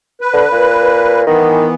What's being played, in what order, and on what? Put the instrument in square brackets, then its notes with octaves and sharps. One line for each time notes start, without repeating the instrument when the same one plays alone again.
[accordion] B4
[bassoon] D3
A#2
[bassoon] D#3 [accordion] E3 B3